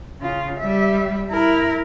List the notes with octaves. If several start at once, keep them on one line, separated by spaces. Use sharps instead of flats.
C#3 F4
G3 E5
E4 A#4